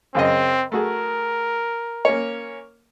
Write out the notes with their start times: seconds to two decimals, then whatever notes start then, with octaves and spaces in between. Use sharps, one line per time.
0.15 F#2 C#3 C4 D#5
0.72 A3 F#4 G#4 A#4
2.05 A#3 C#4 C#5